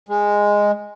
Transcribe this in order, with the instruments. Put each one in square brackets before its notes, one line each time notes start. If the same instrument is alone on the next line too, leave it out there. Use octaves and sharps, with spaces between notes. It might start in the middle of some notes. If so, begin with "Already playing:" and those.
[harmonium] G#3